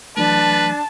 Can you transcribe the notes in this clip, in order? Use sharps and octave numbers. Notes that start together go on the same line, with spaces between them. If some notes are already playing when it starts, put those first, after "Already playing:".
E3 F#3 A3 D4 B4 A5